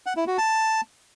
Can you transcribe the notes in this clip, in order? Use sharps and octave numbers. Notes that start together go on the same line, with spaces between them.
F#5
E4
F#4
A5